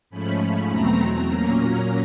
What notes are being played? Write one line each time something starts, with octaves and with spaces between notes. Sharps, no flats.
G#2 F3 A3 C#4 B5
E2 B2 F#3 A3 C4 A#5
A#2 F#3 A#3 C#4